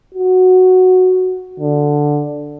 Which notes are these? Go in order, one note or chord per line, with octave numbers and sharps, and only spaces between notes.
F#4
D3